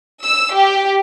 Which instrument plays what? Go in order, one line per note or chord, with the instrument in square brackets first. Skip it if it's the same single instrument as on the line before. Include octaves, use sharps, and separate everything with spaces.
[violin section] E6
G4